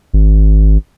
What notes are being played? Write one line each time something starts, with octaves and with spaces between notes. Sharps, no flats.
G#1